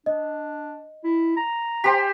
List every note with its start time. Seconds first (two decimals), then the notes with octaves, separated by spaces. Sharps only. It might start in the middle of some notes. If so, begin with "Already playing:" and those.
0.06 D4 D#5
1.04 E4
1.37 A#5
1.84 G4 C5 G5 G#5 C6 B6